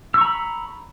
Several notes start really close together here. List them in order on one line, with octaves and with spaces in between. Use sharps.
E6 C#6 A#5 B5